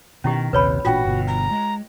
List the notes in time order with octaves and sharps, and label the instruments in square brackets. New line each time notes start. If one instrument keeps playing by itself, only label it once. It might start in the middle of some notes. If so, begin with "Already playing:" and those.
[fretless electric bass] B2 D#3 [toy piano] C#4 E4 G4
[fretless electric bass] A#1 D#2 C3 [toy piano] B4 C#5 B5
[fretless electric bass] A1 A#2 D4 [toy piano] F4 G5 [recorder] F#4
[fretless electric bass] G1 B2
[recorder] A#5
[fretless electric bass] G#3